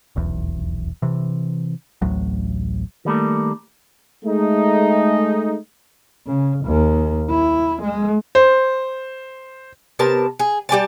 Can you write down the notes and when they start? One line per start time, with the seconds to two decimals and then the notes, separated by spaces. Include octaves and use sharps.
0.16 D#1 B1 E2
1.02 C3 E3
2.02 A1 D2 A2 F#3
3.05 D#3 G3 A3 A#3
4.25 G#3 A3 D#4
6.26 C#3
6.65 D#2
7.30 E4
7.83 G#3
8.35 C5
9.99 C3 B3 A#4 A5
10.39 G#4
10.69 G3 G4 G#5 A5